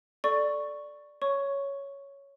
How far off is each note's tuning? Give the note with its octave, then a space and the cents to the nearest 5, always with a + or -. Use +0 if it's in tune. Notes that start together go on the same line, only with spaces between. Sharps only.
A4 +0 D5 +0 C#6 +0
C#5 +5 C#6 +0